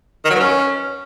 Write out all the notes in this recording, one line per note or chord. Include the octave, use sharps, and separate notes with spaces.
D#3
F#3
B3
C#4